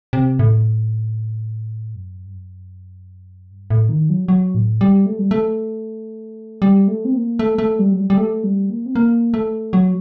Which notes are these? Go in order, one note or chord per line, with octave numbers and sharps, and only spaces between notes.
C3
A2
F#2
G2
F#2
G2
A2
D#3
F#3
F#3
A2
G3
A3
G3
A3
G3
A3
C4
A#3
A3
A3
G3
F#3
G3
G3
A3
G3
A#3
C4
A#3
A3
F#3